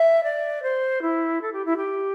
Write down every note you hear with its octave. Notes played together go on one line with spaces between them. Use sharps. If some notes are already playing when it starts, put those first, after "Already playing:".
Already playing: E5
D5
C5
E4
A4
G4
E4
G4